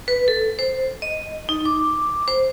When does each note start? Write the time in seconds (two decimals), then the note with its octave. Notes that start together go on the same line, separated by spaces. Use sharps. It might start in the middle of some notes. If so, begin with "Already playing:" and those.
0.08 B4
0.28 A4
0.59 C5
1.02 D#5
1.49 D#4
1.65 D6
2.28 C5